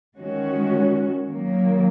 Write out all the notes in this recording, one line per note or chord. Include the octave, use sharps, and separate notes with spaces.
D#3 G#3 C#4 F#4
D#3 F#3 A#3